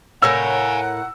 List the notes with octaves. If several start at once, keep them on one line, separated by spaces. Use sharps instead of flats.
A2 A#4 C#5 F5 F#5 G#5 E6